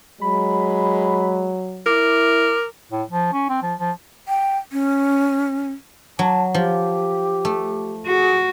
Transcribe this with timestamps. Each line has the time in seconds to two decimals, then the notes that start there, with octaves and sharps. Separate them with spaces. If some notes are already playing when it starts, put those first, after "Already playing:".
0.21 F#3 G#3 B5
1.86 E4 A#4 D6
2.91 A2
3.10 F3
3.33 C#4
3.49 C4
3.62 F3
3.79 F3
4.28 G5
4.72 C#4
6.19 F#3 A5
6.54 F3 G4
7.45 A3
8.07 F#4 G#4